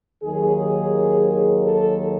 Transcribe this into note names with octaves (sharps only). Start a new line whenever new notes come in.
D#2 D#3 F#3 G#4
A4